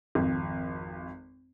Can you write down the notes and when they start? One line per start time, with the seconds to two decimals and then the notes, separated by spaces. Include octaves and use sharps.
0.15 G#1 F2